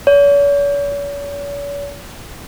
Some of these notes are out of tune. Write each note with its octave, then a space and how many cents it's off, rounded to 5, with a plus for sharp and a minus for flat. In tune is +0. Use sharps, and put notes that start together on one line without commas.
C#5 +45